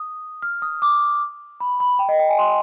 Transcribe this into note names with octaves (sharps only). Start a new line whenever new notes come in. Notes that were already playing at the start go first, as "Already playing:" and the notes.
Already playing: D#6
F6
D#6
D6
B5
B5
G5
D#5
G5
G#5
C6